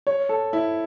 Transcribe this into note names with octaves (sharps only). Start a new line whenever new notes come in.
C#5
A4
E4